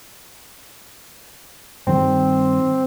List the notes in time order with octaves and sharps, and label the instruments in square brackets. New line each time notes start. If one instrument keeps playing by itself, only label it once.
[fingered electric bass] G2 D#3 G3 [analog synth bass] C4